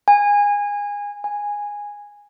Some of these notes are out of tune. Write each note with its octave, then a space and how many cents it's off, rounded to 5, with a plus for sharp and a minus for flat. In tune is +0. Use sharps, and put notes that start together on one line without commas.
G#5 -20
G#5 -10